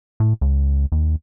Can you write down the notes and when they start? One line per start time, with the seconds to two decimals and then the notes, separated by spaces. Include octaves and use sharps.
0.20 A2
0.41 C#2
0.92 D#2